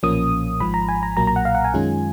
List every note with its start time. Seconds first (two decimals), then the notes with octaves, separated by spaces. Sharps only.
0.03 B1 A#2 F3 A#3 C#4 D#6
0.60 G#1 G#2 F3 B5
0.74 A#5
0.89 G#5
1.03 A#5
1.17 B1 A#2 F#3 A#3 A#5
1.27 A#5
1.36 F#5
1.45 F5
1.55 F#5
1.65 G#5
1.74 F#2 D#3 G#3 C#4 F4